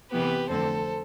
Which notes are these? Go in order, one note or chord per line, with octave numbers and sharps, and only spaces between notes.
C3 E3 B3 G4 B4
F2 D3 A3 C4 A4 C5